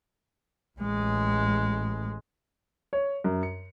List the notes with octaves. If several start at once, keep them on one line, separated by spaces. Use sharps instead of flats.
A1 G#3
C#5
F#2
C#7